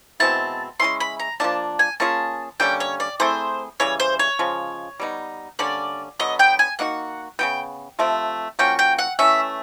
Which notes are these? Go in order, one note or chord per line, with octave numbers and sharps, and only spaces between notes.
B2 G#3 C4 E4 A5
G#3 C#4 E4 C6
B5
A#5
F3 A#3 D4 A5
G#5
A#3 C#4 F4 G#4 A5
D3 G3 A#3 C#4 G5
C#5
D5
A3 C4 E4 G#4 C5
C#3 E3 G3 C#5
C5
C#5
C#3 F3 G#3
G3 B3 D#4
D3 G3 A#3 C#4 D5
D3 F#3 B3 D#5
G5
G#5
A#3 D#4 F#4 F#5
C#3 F#3 B3 G5
C3 F3 A3 C4
F3 A#3 C#4 F#4 G5
G5
F#5
E3 A3 C#4 E5